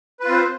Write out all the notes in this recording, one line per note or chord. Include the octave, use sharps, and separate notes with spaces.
C4 F4 B4 C5